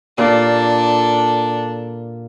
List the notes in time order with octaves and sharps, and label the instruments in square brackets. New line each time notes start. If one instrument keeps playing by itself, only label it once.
[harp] A#2 F4 [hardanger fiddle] D4 A4